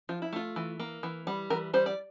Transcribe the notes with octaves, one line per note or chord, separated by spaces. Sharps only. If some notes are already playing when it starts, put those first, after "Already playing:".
F3 F4
E4
A3 F4
E3
A#3
E3
G3
E3 A#4
G3 C5
D5